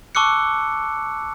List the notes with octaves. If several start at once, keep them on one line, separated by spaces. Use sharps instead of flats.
A5 C#6 D6 E6 F#6 C#7